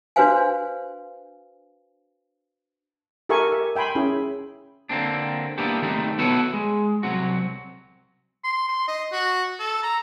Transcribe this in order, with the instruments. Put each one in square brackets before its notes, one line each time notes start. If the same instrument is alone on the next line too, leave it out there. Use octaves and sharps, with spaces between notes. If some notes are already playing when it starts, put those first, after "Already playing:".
[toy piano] D4 F#4 B4 C5 F5 G#5
[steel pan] G4 A4 A#4 E5 G#5 C#6
E5
E5 G5 G#5 B5 C6
C#4 E4 G#4
[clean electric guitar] D3 A#3 C4 D4
A#3 B3 D4 E4 G4
D#3 G3 A3 C4 D#4
B3 E4 F#4 A4 B4 C#5
G#3
C2 F#3 C4 F#4
[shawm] C6
C6
D#5
F#4
A4
A#5